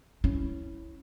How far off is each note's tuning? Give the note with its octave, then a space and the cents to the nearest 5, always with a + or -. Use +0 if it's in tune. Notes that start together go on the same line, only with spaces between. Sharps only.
C#4 +0 E4 +0